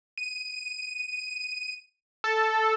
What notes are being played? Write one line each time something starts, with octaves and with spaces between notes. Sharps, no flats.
D#7
A4